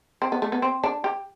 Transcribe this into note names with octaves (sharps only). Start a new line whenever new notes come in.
C4
B3
A3
B3
C4
D4
G4